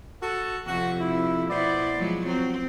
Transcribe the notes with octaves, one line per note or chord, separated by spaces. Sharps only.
F#4 A4
F2 C3 F#4
E4
B2 B3 E4 C5 D5
F3 F#3 G#3
F#3 C4